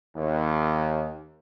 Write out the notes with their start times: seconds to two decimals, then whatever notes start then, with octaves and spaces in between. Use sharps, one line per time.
0.14 D#2